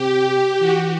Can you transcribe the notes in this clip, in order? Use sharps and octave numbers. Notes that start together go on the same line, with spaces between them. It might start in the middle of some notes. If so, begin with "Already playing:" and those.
Already playing: C3 G4
G4
E3 F#4